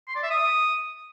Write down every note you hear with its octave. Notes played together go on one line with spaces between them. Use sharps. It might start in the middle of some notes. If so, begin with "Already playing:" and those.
C6
D5
E5
D#6